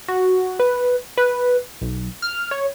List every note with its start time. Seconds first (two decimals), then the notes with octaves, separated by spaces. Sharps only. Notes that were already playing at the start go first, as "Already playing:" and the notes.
0.08 F#4
0.60 B4
1.18 B4
1.81 B1
2.22 F6
2.51 C#5